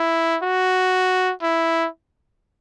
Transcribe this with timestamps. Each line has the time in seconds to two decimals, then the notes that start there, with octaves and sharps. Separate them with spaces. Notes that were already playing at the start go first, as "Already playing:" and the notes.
Already playing: E4
0.43 F#4
1.42 E4